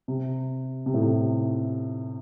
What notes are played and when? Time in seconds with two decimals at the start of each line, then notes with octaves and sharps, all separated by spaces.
0.08 C3
0.86 C3
0.94 A2
1.02 C3